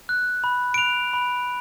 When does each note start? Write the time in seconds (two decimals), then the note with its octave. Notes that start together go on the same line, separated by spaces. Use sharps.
0.09 F#6
0.44 B5
0.74 D7
0.78 F#6 F7
1.13 B5